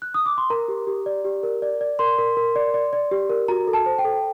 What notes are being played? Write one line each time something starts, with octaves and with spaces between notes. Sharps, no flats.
F#6
D#6
D6
C6
A#4 A#5
G4
G4
D5
G4
A#4
D5
D5
A#4 C6
A#4
A#4
D5
D5
D5
G4
A#4
F#4 A#5
A4
A5
C5
G5
A4